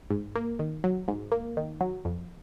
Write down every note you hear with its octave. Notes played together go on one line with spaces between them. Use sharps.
G#2
A#3
D#3
F#3
G#2
A#3
D#3
F#3
F2